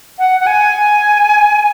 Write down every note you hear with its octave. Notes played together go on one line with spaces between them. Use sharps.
F#5
F#5
G#5